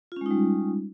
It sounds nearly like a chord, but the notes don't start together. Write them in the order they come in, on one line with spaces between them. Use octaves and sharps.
F4 C#4 G#3 D#4 G3